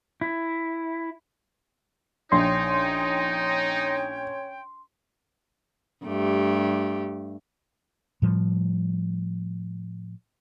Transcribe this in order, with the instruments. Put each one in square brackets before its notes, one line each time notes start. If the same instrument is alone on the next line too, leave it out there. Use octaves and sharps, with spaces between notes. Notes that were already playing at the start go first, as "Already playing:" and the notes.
[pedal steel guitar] E4
[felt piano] A#1 [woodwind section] C#4 C#5 G5 [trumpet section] D#4 [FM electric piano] C6
[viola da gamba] G2 A3 G4
[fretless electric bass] A2 F3 G3